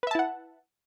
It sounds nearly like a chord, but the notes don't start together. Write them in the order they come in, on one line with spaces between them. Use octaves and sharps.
B4 E5 A5 E4 F#5